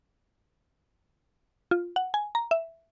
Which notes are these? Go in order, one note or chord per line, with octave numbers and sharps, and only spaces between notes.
F4
F#5
G#5
A#5
E5